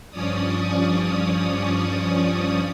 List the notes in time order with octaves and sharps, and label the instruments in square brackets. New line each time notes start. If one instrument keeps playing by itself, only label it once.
[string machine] G2 F3 C#4 C#5 D5 D#6